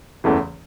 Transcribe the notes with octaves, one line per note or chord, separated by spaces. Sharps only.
F#1 E2 C#3 E3 A3